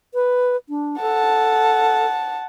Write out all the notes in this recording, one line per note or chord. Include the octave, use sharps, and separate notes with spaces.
B4
D4
A4 F#5 A5